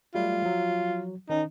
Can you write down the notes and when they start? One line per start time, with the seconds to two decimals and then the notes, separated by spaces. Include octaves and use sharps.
0.15 F#3 G3 A3 F4
0.42 F3 F#3
1.30 D#3 C#4 D#4